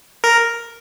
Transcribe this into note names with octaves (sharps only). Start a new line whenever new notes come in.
A#4